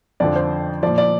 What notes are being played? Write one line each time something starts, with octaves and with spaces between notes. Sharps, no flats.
F2 D3 F3 D5
C5
A#2 F3 D5
D5